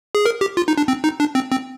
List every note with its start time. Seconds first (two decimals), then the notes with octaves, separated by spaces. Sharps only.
0.15 G#4
0.26 A#4
0.41 G4
0.57 F4
0.68 D#4
0.78 D4
0.88 C4
1.04 D#4
1.20 D4
1.35 C4
1.52 C4